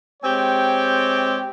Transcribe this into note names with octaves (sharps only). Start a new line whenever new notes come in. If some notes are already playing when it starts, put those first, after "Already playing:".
G#3 C4 G4 C#5 G5